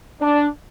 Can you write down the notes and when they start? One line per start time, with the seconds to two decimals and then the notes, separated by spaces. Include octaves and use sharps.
0.21 D4